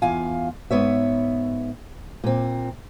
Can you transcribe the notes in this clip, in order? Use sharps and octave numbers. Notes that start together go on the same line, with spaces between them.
E2 F4 F5 G#5
G#2 B3 C#5 E5
A#2 C4